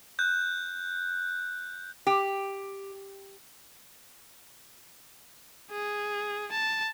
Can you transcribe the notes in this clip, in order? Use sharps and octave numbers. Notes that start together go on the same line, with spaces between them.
F#6 G6
G4
G#4
A5